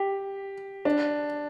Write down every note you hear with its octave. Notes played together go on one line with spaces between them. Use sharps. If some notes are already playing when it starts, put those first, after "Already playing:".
Already playing: G4
D4